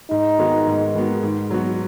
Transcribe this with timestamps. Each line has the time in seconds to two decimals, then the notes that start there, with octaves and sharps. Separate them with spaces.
0.10 G#2 D#4
0.39 D#3 G#3 B3 F#4
0.67 G#2
0.94 D#3 G#3 B3 F#4
1.23 G#2
1.50 F#3 B3 F#4